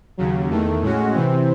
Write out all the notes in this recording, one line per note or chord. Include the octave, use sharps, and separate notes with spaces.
D#2 C#3 F#3
E2 D#3 A3
A2 G#3 C#4 F#4
C3 E3 C4